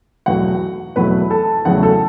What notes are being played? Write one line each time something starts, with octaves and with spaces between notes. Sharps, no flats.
E2 B2 F#3 A3 F#4 F#5
E2 B2 F#3 A3 B4 B5
A4 A5
E2 C#3 F#3 A3 F#4 F#5
A4 A5